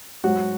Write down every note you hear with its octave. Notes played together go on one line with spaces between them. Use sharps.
G#2 F#3 F#4